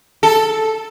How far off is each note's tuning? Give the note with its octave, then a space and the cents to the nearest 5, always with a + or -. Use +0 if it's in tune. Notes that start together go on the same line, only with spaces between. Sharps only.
A4 -5